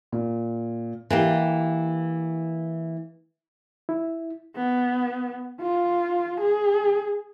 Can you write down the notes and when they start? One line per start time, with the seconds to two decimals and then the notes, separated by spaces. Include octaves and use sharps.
0.12 A#2
1.10 E3 A#3 G4
3.89 E4
4.56 B3
5.61 F4
6.41 G#4